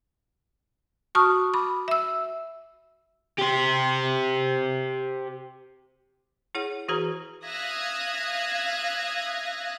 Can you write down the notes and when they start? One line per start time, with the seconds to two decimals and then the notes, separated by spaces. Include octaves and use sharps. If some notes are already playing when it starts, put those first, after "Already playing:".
1.15 F#4 A5 C#6 D#6 F6
1.54 B5 D6
1.88 E5 E6
3.39 G4 C5
6.55 E4 G#4 C#5 F#5
6.88 E3 F#4 G#4 B4 A#5
7.45 E5 F5 D#6 F#6 G#6 A#6